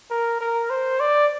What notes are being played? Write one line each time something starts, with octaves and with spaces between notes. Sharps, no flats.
A#4
A#4
C5
D5